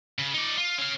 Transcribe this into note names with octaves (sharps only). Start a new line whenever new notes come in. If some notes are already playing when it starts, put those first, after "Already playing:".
C#3
D#4 D5
F4
C#4 F5